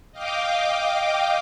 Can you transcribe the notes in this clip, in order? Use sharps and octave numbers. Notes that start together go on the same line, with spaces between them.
D#5 F5 G5 D6